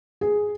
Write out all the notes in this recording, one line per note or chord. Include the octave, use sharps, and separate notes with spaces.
G#4